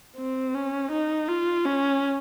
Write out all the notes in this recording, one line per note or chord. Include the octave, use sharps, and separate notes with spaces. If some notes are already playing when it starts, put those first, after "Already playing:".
C4
C#4
D#4
F4
C#4